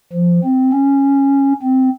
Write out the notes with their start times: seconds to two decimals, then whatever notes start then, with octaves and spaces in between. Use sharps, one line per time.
0.13 F3
0.44 C4
0.73 C#4
1.62 C4